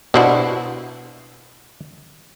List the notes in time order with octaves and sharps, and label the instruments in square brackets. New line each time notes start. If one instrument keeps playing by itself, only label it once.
[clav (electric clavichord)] B2 C5 [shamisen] D4 E4 F#4